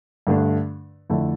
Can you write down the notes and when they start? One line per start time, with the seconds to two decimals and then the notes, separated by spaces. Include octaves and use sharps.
0.27 G2 D3 A3 D4
1.10 F2 D3 A3 E4 A4